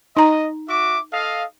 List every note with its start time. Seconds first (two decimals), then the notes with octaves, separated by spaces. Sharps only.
0.17 D#4 D#5 A#5
0.69 F#4 E5 D6
1.13 A4 D#5 F5